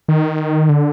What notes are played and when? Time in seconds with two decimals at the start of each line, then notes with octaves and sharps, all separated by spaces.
0.08 D#3
0.69 D3